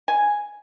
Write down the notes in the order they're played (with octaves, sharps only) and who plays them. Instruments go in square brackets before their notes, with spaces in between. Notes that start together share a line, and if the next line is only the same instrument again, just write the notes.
[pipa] G#5